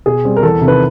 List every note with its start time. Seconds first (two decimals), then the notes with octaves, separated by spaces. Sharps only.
0.06 B2 G#4
0.25 G3 C4
0.37 A#4
0.43 E2 A4
0.61 C3
0.67 D#3 B4